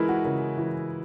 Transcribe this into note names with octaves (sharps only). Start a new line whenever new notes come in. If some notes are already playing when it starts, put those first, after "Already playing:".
Already playing: E3 G#3 E4 A#4 B4
F#4
C#3 A#4
E3